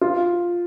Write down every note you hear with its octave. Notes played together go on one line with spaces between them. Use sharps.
F4